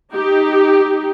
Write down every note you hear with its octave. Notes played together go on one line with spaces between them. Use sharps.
D#4 G4